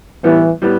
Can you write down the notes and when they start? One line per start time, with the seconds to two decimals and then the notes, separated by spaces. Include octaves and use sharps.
0.24 A2 E3 G3 B3
0.62 A2 G3 B3